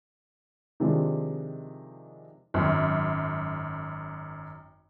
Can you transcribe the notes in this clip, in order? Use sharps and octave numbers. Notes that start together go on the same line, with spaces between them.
C3 D#3 F3 G#3 C4 D4
G#1 F#2